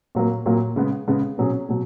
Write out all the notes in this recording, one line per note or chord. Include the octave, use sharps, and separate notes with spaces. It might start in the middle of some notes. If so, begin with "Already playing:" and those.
A#2 F#3 A#3
A#2 F#3 A#3
C#3 G#3 B3
C#3 G#3 B3
B2 F#3 C#4 G#4
B2 F#3